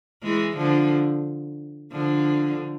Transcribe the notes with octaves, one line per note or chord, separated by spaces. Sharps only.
E3 G#3
D3 F3
D3 F3